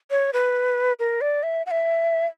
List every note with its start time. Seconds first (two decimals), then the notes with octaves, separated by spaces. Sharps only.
0.11 C#5
0.33 B4
0.99 A#4
1.21 D5
1.43 E5
1.66 F#5
1.71 E5